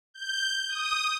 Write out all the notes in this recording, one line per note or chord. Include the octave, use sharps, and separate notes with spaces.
G6
D#6